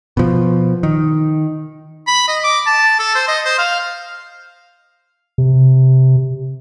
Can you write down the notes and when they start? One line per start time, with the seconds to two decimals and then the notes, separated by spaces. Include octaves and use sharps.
0.17 B2 F3
0.83 D#3
2.07 B5
2.28 D#5
2.44 D6
2.66 A5
2.99 A4
3.15 C5
3.28 D#5
3.45 C5
3.59 F5
5.38 C3